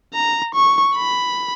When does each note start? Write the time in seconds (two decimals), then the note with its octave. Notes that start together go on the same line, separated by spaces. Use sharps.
0.14 A#5
0.54 C#6
0.96 B5